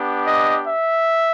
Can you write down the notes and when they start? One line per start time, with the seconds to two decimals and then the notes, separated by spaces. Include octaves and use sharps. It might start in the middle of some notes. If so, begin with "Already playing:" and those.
Already playing: B3 D4 G4
0.24 D#5
0.66 E5